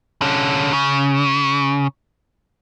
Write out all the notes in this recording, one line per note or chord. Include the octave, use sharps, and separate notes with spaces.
D3 C#4
C#3